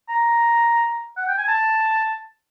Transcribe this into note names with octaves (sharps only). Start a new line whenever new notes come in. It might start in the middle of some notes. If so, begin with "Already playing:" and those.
A#5
F#5
G5
G#5
A5